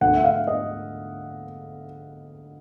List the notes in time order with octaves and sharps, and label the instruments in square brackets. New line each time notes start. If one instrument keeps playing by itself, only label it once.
[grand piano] D2 D3 F#5
E5
F5
D#5